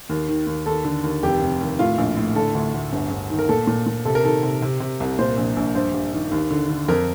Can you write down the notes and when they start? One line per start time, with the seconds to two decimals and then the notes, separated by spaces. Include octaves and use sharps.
0.09 D#2
0.29 D#3
0.47 D#2
0.66 D#2 A4
0.85 D3
1.03 D#2
1.23 F1 G4
1.42 F1
1.60 D#2
1.79 A2 F4
1.98 A#1
2.17 A2
2.35 D3 A4
2.54 D2
2.74 D2
2.92 G1
3.11 G1
3.30 D#3
3.39 A#4
3.49 A#2 A4
3.67 A#2
3.86 A#2
4.05 C3 A4
4.15 A#4
4.24 D#3 A4
4.43 C3
4.62 C3
4.80 C3
5.00 C2
5.19 A#2 C5
5.37 A#1
5.56 A#1
5.75 G2 C5
5.94 G2
6.13 D#3
6.31 D#2
6.51 D3
6.70 D3
6.88 F2 A#4